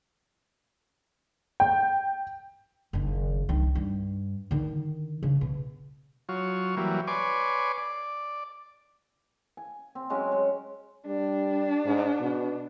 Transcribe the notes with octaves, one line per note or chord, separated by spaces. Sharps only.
G5
F#1 D#3
C2 D#3
G2
D3 D#3
C#3
B2
F#3 F4 C#5
E3 F#3 G3 A#3
B4 C#5 D5 G#5 C6 D6
D5
G#5
C4
F#3 G#3 C#4 F#4
G#3
G3 D4
G#2
B2